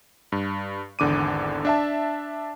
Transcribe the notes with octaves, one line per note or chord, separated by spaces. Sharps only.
G2
G#1 E2 D3 D6 D#7
D4 E5 A5